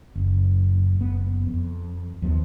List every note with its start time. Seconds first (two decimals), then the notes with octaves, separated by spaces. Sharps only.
0.15 F#1
0.99 F#1 B3
1.47 F2
2.22 D#2 F3 B3